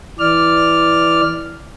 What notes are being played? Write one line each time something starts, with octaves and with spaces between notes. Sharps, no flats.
E3 D5 F6